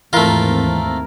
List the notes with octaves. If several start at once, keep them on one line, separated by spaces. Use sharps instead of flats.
D#2 G#2 E3 A3 C4 E4 F4 A#4